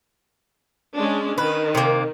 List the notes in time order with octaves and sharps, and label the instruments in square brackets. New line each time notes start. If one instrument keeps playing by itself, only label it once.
[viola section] G#3 C#4 D4
[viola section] D#3 [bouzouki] B4
[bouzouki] C3 A#3